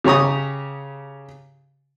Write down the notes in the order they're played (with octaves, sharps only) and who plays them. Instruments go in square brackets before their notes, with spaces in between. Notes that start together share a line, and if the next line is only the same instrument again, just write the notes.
[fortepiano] C#3 G4 C#5 A#5 D#6